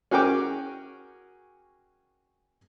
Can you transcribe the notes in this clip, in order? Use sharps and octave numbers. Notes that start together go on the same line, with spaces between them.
C#4 F#4 G#4 A#4 G5 D6